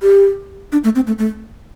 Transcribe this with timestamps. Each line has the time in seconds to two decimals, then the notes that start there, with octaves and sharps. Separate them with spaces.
0.02 G4
0.72 D4
0.84 A3
0.95 C4
1.07 A3
1.18 A3